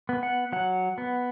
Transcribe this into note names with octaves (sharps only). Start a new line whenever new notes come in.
B3
F#5
F#3 F#5
B3